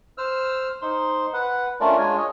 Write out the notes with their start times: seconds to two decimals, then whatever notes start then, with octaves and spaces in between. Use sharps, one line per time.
0.18 C5 E6 F6
0.82 D#4 C5 C6
1.34 B4 F#5
1.80 A3 C#4 D4 F4 A#4 D5
1.98 G#3 D4 F4 C#5 G#5
2.18 C#5 D#5